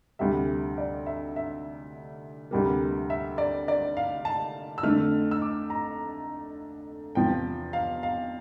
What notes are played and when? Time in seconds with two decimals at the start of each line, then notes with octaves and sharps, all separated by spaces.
0.19 D2 C3 G3 E5
0.78 D5
1.06 E5
1.36 E5
2.51 D2 C3 G3 A#3
3.10 E5
3.38 D5
3.68 D5
3.97 F5
4.25 A5
4.78 E6
4.83 F2 D3 A3 F6
5.31 E6
5.42 D6
5.70 A#5
7.15 E2 C3 F3 G5
7.73 F5
8.03 F5